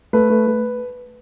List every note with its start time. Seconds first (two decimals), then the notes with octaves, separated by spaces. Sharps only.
0.13 A3 B4
0.30 A3
0.47 A3